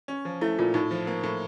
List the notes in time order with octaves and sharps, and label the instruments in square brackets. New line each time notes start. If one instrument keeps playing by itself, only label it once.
[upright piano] C#4
F3
[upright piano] A3 [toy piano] E4
[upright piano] A#2 [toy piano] F4
[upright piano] A2 [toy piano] D#4
[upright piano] F3
A#3
A2